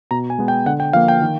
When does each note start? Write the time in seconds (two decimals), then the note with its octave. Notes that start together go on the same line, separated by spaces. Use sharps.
0.11 B2 A#5
0.30 G#5
0.38 G#3 B3
0.48 G5
0.66 D3 F#5
0.80 G5
0.93 F3 A#3 F5
1.08 G5
1.22 D#3